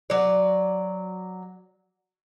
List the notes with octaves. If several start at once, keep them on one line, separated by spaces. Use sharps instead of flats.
F#3 D5